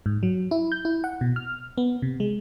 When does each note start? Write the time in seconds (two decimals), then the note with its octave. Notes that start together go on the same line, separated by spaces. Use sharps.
0.06 G#2
0.23 F#3
0.51 E4
0.72 G6
0.85 E4
1.04 F#5
1.21 B2
1.36 F6
1.78 B3
2.02 C3
2.20 G#3